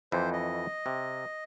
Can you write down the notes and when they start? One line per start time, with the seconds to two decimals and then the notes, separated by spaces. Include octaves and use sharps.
0.12 F2 E3 C5
0.33 D#5
0.86 C3